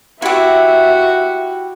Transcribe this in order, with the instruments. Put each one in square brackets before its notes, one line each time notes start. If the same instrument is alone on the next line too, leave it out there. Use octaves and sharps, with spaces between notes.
[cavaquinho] E4 G4 [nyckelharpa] F#4 [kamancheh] E5